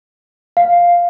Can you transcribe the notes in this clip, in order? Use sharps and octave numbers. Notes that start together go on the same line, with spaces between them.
F5